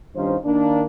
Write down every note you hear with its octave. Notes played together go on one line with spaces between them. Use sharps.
G2 D#3 C#4 D#4 F4 C5
D#3 A#3 D4